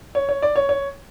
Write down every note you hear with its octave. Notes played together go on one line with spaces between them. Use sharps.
C#5
C#5
D5
C#5
C#5